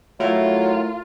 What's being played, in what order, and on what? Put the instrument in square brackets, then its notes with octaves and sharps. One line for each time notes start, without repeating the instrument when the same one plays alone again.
[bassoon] F#3 [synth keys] A3 E4 A#4 [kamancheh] F4